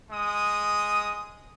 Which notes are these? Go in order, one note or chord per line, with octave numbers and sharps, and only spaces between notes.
G#3 D#6